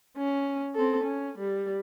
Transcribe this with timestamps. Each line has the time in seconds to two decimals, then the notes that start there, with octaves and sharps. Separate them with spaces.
0.17 C#4
0.75 C4 A4
1.03 C#4
1.38 G3